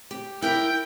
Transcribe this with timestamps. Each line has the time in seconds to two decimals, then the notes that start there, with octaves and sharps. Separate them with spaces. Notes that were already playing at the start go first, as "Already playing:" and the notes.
0.11 G4
0.42 E4 A#4 E5 G5